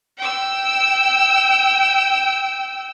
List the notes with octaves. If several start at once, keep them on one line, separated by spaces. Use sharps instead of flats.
G5 E6